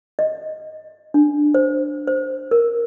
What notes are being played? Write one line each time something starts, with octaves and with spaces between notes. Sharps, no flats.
D#5
D4
C5
C5
A#4